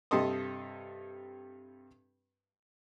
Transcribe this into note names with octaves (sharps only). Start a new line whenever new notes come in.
G2 C3 A4 D#5 C6 D#6